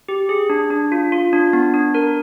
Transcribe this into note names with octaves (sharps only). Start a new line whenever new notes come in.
G4
G#4
D4
D4
F4
F4
D4
B3
D4
A#4